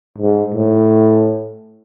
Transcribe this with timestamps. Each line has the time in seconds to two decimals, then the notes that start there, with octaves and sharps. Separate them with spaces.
0.18 G#2
0.54 A2